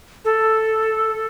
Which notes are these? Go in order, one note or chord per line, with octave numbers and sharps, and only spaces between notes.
A4